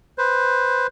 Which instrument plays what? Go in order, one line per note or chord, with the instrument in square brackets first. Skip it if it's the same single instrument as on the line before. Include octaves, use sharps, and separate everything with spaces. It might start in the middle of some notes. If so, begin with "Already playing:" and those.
[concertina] B4 C5